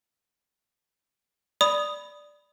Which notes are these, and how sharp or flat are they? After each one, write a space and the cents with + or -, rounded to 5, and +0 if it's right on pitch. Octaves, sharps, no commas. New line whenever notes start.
D5 +0 B5 +10 D#6 +0